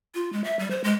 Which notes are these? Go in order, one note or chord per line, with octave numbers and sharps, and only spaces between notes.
F4
G#3
E5
G3
C5
G#3